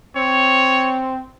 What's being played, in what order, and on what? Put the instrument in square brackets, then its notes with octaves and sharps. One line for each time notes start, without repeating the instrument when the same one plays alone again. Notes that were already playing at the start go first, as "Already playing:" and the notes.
[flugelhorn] C4 [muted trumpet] C#5